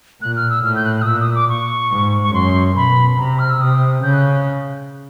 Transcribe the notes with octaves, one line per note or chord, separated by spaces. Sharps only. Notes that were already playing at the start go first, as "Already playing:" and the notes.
A#2 F#6
F6
E6
A2 F6
G6
F#6
F#6
D#6
A#2 E6
D#6
D6
C#6
G#2
C#6
F#2 C6
B2 B5
C3 A#5
F6
E6
C3 D#6
C#3 G6
F#6